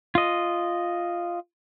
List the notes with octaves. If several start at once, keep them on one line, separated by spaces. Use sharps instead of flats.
F4 D#5